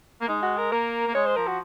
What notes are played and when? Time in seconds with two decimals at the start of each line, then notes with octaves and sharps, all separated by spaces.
0.21 A#3
0.28 G#3 D#4
0.42 F#4
0.58 A#4
0.72 A#3 A#4
1.08 A#3
1.15 G#3 C#5
1.25 C5
1.36 F3 A#4
1.47 F#4